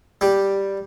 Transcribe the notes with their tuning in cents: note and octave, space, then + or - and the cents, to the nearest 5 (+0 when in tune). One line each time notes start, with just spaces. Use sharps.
G3 +0 G4 +0